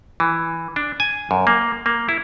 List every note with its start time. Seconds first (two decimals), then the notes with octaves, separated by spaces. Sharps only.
0.20 E3
0.76 D4
1.00 G#5
1.31 F#2
1.47 A#3
1.86 A#3
2.09 E4